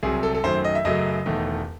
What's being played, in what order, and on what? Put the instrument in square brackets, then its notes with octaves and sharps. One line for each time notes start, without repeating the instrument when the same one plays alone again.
[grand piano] C2 C3 F#3 G#4
A4
A4
F#2 D#3 F#3 A3 C5
D#5
E5
F#2 C#3 F#3 A3 D#5
E1 E2 D#3 A3